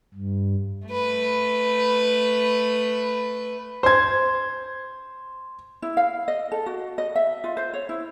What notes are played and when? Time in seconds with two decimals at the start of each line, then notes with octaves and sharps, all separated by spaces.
0.14 G2
0.88 A3 B4
3.83 C5 G#6
5.82 E4
5.97 F5
6.28 D#5
6.52 A4
6.66 F#4
6.98 D#5
7.15 E5
7.44 F4
7.57 C5
7.73 C#5
7.89 E4